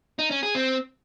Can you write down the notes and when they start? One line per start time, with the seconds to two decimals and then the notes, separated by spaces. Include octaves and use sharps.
0.19 D#4
0.31 C#4
0.43 G#4
0.55 C4